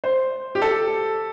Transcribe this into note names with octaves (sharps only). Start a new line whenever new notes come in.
C5
G4
A4